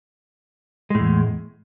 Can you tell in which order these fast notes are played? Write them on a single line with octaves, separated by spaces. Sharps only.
G#3 A2 E2